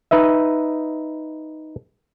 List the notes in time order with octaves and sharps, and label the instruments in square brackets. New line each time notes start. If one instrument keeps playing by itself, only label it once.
[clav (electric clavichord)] D#4 B4 D#5 E5